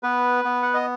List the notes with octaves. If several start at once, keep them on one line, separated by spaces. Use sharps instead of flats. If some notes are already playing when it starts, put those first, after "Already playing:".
B3 B4
B3
F#5
D#5